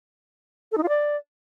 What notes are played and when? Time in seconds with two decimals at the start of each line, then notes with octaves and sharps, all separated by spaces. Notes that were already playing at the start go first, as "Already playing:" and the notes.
0.72 A4
0.77 D#4
0.83 F4
0.89 D5